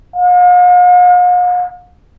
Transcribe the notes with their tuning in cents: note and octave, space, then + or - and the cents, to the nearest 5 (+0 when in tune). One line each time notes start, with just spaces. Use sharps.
F5 +45